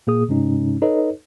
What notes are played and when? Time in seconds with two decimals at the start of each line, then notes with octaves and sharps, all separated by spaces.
0.07 A#2 A#3 G#4 D#6
0.28 G2 C3 G#3 C#4 D#4
0.82 D#4 A4 B4 C#5 D#5